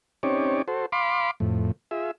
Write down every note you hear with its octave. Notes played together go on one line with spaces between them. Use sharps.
C4 C#4 D#4 G4 C#5 D5
F#4 A4 C5
F5 B5 C6 D6
F2 A2
F4 G#4 E5